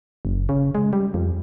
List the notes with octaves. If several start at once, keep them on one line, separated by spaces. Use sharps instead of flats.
F#1
C#3
G#3
G3
F2